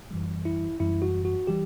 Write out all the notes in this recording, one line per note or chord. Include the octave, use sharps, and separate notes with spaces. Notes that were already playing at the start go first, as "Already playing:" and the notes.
F#2 E3 G3
E4
F#2 E3 G3 E4
F#4
F#4
E3 G3 G4